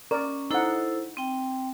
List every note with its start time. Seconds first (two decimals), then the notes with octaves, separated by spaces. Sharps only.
0.11 C#4 A#4 D5
0.51 D#4 E4 A4 C5 F#5
1.17 C4 G5